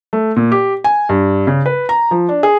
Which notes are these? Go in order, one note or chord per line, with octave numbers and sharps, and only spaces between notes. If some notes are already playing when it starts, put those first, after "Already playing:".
A3
A#2
G4
G#5
G2
C#3
B4
A#5
F3
D4
G#4